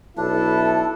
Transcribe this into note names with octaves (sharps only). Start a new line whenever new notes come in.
B1 D4 E4 A4